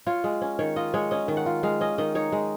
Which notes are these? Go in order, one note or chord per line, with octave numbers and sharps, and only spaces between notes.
F4 C#5
G#3
C#4
D#3 C#5
F4 D#5
G#3 C#5
C#4 D#5
D#3
F#5
F4
G#3 F5
C#4 D#5
D#3 D#5
D#4 C#5
G#3